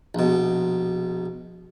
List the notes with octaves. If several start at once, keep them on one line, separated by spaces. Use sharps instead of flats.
A#1 B2